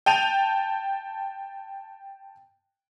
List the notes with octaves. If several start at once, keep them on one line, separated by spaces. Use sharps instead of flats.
G5 A5 D#7 F7